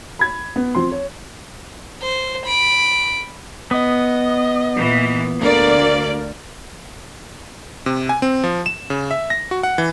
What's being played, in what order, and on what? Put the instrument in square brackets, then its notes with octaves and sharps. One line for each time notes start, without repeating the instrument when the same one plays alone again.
[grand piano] B5 G#6
B3
F3 C4 C6
C#5
[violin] C5
B5 D7
[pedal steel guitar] B3 [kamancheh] D#5
[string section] A#2 E3
[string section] D2 D5 [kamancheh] A#3 A#4
[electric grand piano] C3
G#5
C4
F3
E7
C#3
E5
A#6
F#4
F#5
E3